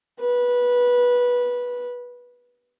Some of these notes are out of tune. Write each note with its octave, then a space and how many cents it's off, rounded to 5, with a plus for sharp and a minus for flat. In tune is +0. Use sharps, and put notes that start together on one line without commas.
B4 -15